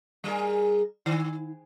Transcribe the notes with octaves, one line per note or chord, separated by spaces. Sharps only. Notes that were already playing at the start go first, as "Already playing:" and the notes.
G3 G#4 A#4
D#3